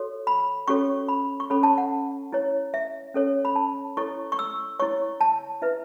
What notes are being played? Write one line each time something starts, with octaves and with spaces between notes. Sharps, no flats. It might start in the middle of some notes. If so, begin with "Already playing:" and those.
Already playing: F#4 A4 C#5
B5
C#4 F#4 A4 C#5 C#6
B5
C#6
C#4 A4 C#5 B5
A5
F#5
E4 C#5
E5
C#4 A4 C#5
B5
A5
E4 A4 C#5 C#6
C#6
E6
E4 C#5 C#6
A5
E4 B4 E5